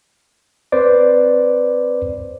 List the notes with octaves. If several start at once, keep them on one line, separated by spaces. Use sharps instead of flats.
C4 B4 C5 D5